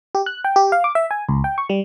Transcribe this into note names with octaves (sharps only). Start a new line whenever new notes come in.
G4
F#6
G5
G4
F5
D6
E5
G#5
C#2
G5
C#6
G3